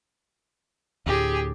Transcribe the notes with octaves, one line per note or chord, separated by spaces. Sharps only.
D2 A2 G4 G#4